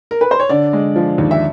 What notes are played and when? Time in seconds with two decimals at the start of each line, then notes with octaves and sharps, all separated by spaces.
0.11 A#4
0.21 B4
0.31 C5
0.40 C#5
0.49 D3 D5
0.73 G#3
0.96 F3
1.18 D#2
1.31 E5